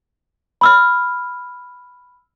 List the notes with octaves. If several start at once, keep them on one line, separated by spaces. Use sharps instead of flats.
B5 E6 F6